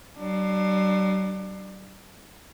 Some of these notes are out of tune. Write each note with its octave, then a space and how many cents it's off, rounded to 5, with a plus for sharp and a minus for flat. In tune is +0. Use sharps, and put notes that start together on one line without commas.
G3 -45 D4 +30